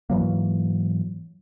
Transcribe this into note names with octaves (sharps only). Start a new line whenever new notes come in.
G#2 E3 F#3 A#3